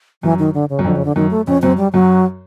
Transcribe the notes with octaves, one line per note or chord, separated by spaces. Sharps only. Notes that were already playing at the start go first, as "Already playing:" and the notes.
F#2 E3
D#3
D3
C#3
F#2
F2 D3
C#3
D3
F#2 D#3
A3
F2 C#4
F#2 C4
G3
F#2 F#3